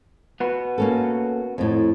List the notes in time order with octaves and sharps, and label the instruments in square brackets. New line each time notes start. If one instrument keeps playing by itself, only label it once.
[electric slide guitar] B3 F#4 B4
[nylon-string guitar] A#3 C#4 A4
F2 A2